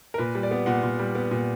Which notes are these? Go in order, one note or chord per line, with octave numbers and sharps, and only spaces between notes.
A#4
A#2 B4
G3
D5
B3
A#2 F#5
A#2
G3
B3
A#2